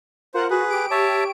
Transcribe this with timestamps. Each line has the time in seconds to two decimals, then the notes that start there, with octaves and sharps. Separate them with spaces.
0.34 F4 A#4 C5 F#5
0.50 F#4 G#4 B4
0.69 G4 D7
0.91 C#5 E5 A5